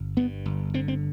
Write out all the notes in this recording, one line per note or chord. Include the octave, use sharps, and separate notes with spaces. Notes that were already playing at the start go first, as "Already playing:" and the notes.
Already playing: G1
G2 B3
G1
D3 C4
C4